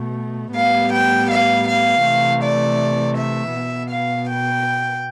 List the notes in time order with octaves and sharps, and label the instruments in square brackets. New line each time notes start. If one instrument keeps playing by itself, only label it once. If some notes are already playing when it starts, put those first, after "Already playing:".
Already playing: [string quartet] B2 A3
A2 G3 B3 F5
G5
F5
F5
C3 E3 A3
D5
E5
B2 B3
F5
G5